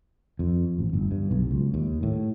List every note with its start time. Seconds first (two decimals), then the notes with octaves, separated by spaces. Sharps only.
0.39 F2
0.79 A1
0.93 G1
1.11 G2
1.31 B1
1.51 C#2
1.74 D#2
2.03 A2